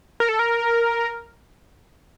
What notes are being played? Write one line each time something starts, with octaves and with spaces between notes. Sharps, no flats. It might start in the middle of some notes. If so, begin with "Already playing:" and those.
A#4
A4
A#4